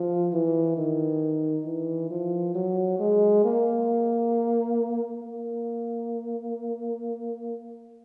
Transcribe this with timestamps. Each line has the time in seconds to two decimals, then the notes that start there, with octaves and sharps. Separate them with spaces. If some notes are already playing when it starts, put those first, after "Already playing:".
Already playing: F3
0.32 E3
0.77 D#3
1.65 E3
2.10 F3
2.55 F#3
2.99 G#3
3.44 A#3
5.22 A#3